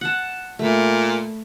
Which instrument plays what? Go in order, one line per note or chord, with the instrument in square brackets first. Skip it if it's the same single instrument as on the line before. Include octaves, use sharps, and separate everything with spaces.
[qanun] F#5 A5
[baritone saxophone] A#2 [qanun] A3 B5